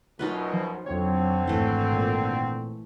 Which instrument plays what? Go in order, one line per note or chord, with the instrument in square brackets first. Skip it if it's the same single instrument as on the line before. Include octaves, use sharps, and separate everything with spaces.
[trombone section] B1 F#2 B2 [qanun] D#4 F4 B4
[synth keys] F3
[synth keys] F2 C#5 [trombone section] D3 C4 [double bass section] F#3
[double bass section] G#1 [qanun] E3 A3
[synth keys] A#2